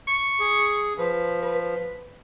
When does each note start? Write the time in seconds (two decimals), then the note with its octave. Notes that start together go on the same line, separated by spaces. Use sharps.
0.08 C#6
0.40 G#4
0.98 F3 B4
1.43 B4